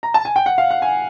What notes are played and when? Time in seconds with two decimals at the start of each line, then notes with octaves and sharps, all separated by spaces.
0.03 A#5
0.14 A5
0.25 G#5
0.36 G5
0.46 F#5
0.58 F5
0.70 F#5
0.82 G#5